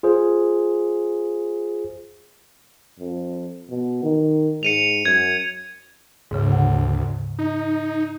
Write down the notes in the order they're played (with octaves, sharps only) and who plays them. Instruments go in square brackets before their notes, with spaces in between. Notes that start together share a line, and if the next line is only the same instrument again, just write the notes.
[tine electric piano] F4 G#4 C5
[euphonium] F2
B2
D#3
[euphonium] G#2 [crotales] C#7 D#7 F7
[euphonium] F#2 [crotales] G#6
[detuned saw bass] D2 [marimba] G#2 C#3
[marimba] F#5
[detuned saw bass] D#4